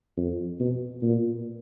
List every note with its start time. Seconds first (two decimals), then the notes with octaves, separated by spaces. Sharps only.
0.17 F2
0.60 B2
1.03 A#2